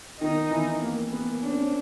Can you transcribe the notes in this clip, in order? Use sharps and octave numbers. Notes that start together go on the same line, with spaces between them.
D#3 D#4
E3
A#3
B3
C#4 D4
C4
C#4